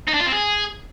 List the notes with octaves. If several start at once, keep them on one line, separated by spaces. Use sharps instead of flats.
D#4
D4
F4
C4
G#4